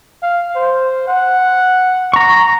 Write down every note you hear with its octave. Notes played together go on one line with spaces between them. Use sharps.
F5
C5
F#5
A#5 C#6